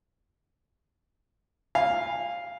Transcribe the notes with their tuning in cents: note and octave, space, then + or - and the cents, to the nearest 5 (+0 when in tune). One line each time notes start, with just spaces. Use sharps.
F5 +0 G#5 -25